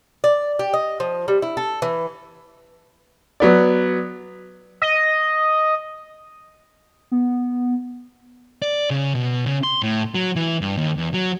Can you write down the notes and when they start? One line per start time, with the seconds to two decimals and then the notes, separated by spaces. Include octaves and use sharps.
0.24 D5
0.59 G4
0.74 D#5
1.00 F3
1.28 G3
1.42 E4
1.57 A4
1.82 E3
3.40 F#3 B3 D5
4.82 D#5
7.11 B3
8.62 D5
8.90 C#3
9.15 B2
9.46 C#3
9.63 C6
9.83 A2
10.15 F#3
10.36 E3
10.61 G2
10.77 D#2
10.97 E2
11.14 F#3